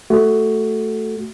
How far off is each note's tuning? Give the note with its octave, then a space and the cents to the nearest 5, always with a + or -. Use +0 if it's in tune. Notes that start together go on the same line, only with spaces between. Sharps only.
A3 +0 F#4 +10